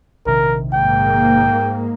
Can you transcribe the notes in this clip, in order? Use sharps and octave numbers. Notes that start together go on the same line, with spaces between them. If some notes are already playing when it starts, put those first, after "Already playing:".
A#1 C3 D#3 A#4
G#2 A#3 G5